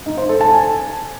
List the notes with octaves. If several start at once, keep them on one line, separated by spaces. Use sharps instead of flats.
D#4
C5
A4
A5
G#5